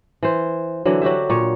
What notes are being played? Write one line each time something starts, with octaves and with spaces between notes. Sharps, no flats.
E3 C5
D3 E3 F#3
F#3 F#4 G4 E5
A#2 C#5